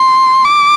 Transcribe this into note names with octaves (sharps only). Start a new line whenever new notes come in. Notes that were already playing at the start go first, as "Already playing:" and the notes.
Already playing: C6
D6